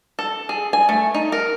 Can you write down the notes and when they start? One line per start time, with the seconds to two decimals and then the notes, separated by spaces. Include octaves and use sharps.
0.19 A4
0.49 G#4
0.73 G#5
0.89 A3
1.14 D#4
1.32 A#4